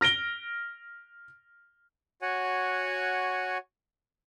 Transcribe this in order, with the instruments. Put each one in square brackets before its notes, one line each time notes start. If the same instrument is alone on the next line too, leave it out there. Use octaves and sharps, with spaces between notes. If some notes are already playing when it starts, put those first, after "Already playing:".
[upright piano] F6 A#6 D7 G7
[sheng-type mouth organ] F#4 C#5 F#5 G#5